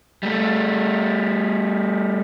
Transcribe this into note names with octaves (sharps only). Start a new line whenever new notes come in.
G3 A3